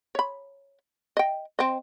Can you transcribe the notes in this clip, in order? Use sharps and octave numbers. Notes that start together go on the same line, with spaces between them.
C#5 B5
D#5 G5
C4 D#5